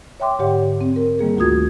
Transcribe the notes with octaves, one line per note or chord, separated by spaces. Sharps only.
C#5 E5 G5 C6 D6
G#2 D3 G4 C#5 F#5 G5
C4
A#4
D#3 G3 A#3 G#4
D2 A3 F4 F#4 D#6 G#6